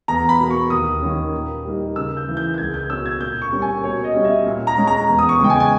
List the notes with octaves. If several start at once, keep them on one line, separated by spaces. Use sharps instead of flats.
E2 A#5
B5
B2 A#3
C#6
D#2 D#6
D#3 A#3 C#4
A#2
G3 A#3 D#4
C#3 E6
G6
E3 A#3
G6
G6
C#2 G#6
G6
B2 A#3 C#4 E6
G#6
A#2 G6
C#6
G3 A#3 C#4
G#5
B2 C#5
D#5
G3 C#4
E5
A#2
A#5
G#3 C#4
A#5
E2
D#6
C#6
C#3 G#3 G5
G#5
G#5